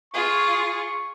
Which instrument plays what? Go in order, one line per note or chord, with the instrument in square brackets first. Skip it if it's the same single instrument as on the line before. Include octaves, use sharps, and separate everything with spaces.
[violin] F4 G#4 [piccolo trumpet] C#6